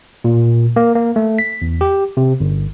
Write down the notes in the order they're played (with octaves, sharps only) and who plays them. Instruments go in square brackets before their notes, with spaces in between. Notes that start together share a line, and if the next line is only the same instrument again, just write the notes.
[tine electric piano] A#2
A#3
A#3
A3
B6
E2
G4
C3
G1